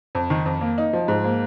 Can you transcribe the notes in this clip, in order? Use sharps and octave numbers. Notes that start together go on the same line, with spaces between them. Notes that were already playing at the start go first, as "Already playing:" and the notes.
F2
D#3
F2
A#3
D#4
F3
G#2
A#3